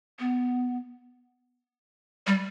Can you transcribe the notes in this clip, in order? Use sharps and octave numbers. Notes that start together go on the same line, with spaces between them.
B3
G3